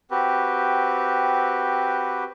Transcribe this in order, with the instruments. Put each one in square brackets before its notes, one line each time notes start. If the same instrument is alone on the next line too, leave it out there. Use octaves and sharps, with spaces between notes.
[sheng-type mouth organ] C4 F#4 G4 B4